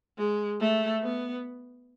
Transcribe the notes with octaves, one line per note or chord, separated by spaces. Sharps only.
G#3
A3
B3